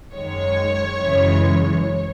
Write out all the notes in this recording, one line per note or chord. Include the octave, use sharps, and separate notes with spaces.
F#2 D#3 G#3 C#5
F#2 C#3 E3 G#3